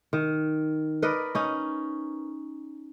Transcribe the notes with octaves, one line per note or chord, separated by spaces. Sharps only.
D#3
A#4 B4 D5 D#5
C#4 D#4